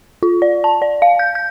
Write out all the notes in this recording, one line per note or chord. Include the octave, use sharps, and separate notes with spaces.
F4
D5
A5
D5
F5
G6
G6